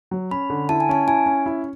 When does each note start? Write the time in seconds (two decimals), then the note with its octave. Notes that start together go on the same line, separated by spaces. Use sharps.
0.11 F#3
0.31 C#4 B5
0.50 D3
0.69 E4 A5
0.80 G#5
0.89 C#4 A5
1.07 E4 G#5
1.26 C#4
1.46 E4